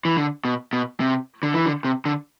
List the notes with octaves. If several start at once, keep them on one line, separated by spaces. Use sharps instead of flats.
E3
D3
B2
B2
C3
D3
E3
D3
C3
D3